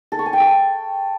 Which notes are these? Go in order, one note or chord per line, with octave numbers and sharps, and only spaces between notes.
A4
C#6
G#5
G5
A4